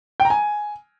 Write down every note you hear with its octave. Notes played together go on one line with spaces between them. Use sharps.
G5
A#5
G#5